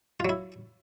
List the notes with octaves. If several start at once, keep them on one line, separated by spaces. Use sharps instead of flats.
F#3 E4 F4